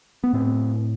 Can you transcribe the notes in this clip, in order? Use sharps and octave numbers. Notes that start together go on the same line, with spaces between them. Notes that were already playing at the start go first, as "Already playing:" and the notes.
B3
A2 C4